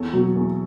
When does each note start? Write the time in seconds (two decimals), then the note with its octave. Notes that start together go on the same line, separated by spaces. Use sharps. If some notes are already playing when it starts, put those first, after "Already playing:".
Already playing: E2 A4 C#5
0.13 B2 F#3
0.36 E2